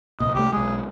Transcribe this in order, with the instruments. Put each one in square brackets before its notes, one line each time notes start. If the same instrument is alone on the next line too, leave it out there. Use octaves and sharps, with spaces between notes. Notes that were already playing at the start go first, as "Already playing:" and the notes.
[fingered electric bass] C2 A#2 [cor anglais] D#5
[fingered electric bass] C2 A3 [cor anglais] G4
[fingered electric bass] B1 G#3 [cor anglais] G#4